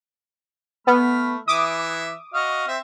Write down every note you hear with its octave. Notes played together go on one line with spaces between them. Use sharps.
A3 B3 B5 F6
E3 E5 D6 D#6
F#4 D#5 F5
C4 E5